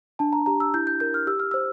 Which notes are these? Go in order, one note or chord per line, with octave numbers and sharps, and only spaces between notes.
D4 A5
A#5
G4 A#5
E6
E4 G6
G6
A#4 G6
F6
G4 E6
F6
C5 E6